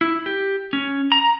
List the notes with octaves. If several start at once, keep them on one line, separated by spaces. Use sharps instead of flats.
E4
G4
C#4
A#5